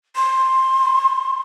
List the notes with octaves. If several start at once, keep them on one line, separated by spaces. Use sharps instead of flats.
C6